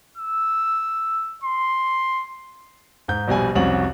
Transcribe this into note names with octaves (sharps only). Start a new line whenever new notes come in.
E6
C6
G#2 G6
A#1 B2 G3 G#5
C2 F2 C#4 F#4 F#7